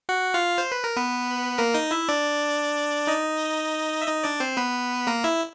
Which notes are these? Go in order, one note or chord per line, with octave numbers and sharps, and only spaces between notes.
F#4 F#5
F4 F5
C5
B4
A#4
B3 B4
A#3 A#4
D#4 D#5
E4 E5
D4 D5
D#4 D#5
E5
D#4 D#5
D4 D5
C4 C5
B3 B4
A#3 A#4
E4 E5